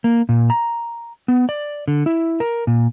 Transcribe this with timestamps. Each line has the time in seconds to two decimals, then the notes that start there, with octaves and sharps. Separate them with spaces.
0.04 A#3
0.29 A#2
0.50 A#5
1.28 B3
1.49 D5
1.88 D3
2.06 E4
2.40 A#4
2.67 A#2